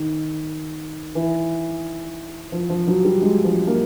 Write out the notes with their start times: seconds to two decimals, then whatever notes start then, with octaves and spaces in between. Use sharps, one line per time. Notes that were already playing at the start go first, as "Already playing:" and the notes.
Already playing: D#3
1.15 E3
2.52 F3
2.69 F3
2.87 F#3
3.04 G3
3.22 G#3
3.44 F3
3.67 A#3